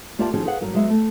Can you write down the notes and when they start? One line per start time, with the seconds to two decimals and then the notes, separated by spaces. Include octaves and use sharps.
0.19 A#3 F4 G4 D5 E5 A5
0.34 D#3 F3 C#4 F#4 G#4
0.46 G#4 B4 F5 F#5
0.61 G2 F#3 A#4
0.74 F#3 G#3 B3 E5
0.90 A3